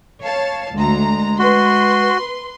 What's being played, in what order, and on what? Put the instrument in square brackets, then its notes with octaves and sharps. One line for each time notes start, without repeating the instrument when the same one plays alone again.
[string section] C#5 F5 A5
[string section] D2 A#5 [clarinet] G#3
[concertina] F#4 [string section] B4 C6